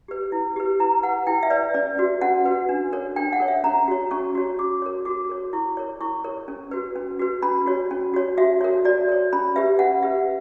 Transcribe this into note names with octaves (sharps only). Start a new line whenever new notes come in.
G4 B4
E4
G4 B4
E4 A#5
B4 F#5
E4 G5
E5
B4 D5
C#4 D5
F#4 B4
C#4 F#5
F#4 B4
D4
A#4 C#5
D4 G5
F#5
A#4 C#5
E5
C#4 A#5
F#4 C#5
C#4 C#6
F#4 C#5
F#4 D6
A#4 C#5
F#4 D6
A#4 C#5
E4 C#6
A#4 C#5
E4 C#6
A#4 C#5
C#4
F#4 B4
C#4
F#4 B4
C#4 B5
F#4 C#5
C#4
F#4 C#5
F#4 E5
A#4 C#5
F#4 D5
A#4 C#5
C#4 B5
G4 B4 E5
C#4 F#5
G4 B4 E5